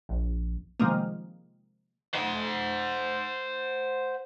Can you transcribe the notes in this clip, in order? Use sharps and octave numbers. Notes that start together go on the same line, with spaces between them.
A#1
C3 D#3 F3 G3 G#3 A#3
C5 F#5